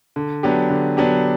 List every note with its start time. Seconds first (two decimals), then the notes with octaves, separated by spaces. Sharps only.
0.16 D3
0.43 F#3 B3 D4 G4
0.70 D3
0.97 F#3 B3 D4 G4